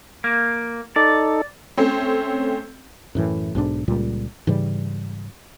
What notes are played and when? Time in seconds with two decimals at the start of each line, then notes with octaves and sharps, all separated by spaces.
0.24 A#3
0.96 D#4 A4 D5
1.77 A3 C4 C#4
3.15 F#2 A2 E3
3.55 B1 G#2 G3 D4
3.88 C#2 A#2 G3
4.47 G#2 C#3 E3 G3